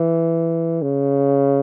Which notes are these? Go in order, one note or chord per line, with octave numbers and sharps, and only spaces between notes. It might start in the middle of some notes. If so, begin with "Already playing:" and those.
Already playing: E3
C#3